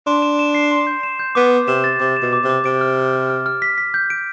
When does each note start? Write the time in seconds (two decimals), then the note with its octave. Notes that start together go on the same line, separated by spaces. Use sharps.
0.07 D4 C6
0.22 E7
0.39 E7
0.55 C7
0.71 C6
0.87 G6
1.03 E7
1.19 G6
1.35 B3 D6
1.52 D6
1.68 C3 E7
1.84 A6
2.00 C3 D6
2.17 E7
2.22 B2
2.33 D6
2.44 C3
2.49 D6
2.65 C3 D7
2.81 F6
2.98 F6
3.13 F6
3.30 F6
3.46 F6
3.62 B6
3.78 B6
3.94 G6
4.10 D7